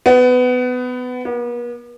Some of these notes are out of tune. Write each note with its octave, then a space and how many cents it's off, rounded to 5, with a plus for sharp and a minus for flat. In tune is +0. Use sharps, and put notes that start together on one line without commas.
B3 +20
B3 -45